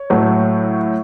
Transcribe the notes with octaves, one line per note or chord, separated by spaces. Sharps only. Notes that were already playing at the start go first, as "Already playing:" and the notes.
Already playing: C#5
A2 F#3 A3